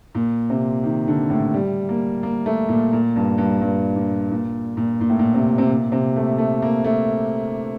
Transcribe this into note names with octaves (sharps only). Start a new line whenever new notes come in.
A#2
C3
D#3
D3
A2
G3
A#3
A#3
A3
A#2
A#2
G2
G2
G2
A#2
A#2
A#2
A#2
A2
A#2
C3
C3
A#2
C3
A3
A3
A#3
A3